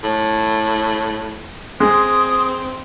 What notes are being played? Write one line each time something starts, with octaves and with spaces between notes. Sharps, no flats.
A2
G#3 C4 D#6